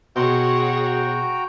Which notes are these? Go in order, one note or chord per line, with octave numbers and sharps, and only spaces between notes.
B2 F#4 G#4 C#5 F#5 G5 A#5 C6